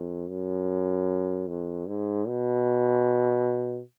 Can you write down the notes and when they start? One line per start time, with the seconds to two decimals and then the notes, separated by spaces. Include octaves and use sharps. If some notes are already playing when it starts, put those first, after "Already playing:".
Already playing: F2
0.29 F#2
1.48 F2
1.88 G#2
2.28 B2